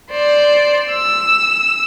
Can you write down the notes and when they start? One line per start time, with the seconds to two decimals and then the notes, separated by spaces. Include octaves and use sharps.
0.11 C5 D5
0.90 E6